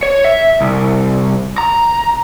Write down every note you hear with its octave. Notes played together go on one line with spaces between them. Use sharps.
C#5
E5
C2
A#5